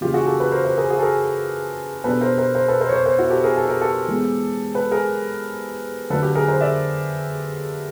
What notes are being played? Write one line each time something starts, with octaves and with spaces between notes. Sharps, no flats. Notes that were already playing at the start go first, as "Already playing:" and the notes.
C#3 E3 G3 A#3 F4 G4
F#4 G#4
G4 A4
A4 B4
A#4 C5
A#4 C5
G#4 A#4
F#4 G#4
A4
G#4 A#4
B2 G3 B3 D4 A4 B4
A#4 C5
A#4 C5
A#4 C5
A4 B4
A#4 C5
C#5
A#4 C5
A#4 C5
E4 F#4
G4 A4
G#4 A#4
A4
A#4
G4 A4
E3 G#3 B3
A4 B4
G#4 A#4
D3 F#3 A3 D4 A4 B4
G4 A4
G#4 A#4
A#4 C5
D5 E5